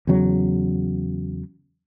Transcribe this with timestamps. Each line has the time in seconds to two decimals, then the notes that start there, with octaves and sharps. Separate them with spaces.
0.07 E2 C#3 F#3